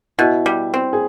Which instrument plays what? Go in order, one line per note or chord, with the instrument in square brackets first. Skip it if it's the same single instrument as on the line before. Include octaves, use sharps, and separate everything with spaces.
[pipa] B2 [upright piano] E4 F#4
[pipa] G3
C4
[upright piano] G#4